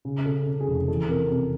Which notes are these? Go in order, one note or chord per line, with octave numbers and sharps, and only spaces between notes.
C#3
C#3 A4
C#3
G#4
F1
E2 A4
C3 A#4
C3